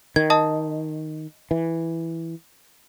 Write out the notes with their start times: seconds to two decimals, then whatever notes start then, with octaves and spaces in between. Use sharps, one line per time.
0.16 D#3 G#6
0.30 D#5 A5 D#6
1.51 E3